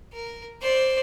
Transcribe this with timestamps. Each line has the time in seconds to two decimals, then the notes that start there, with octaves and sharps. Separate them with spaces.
0.13 A#4
0.62 C5 D5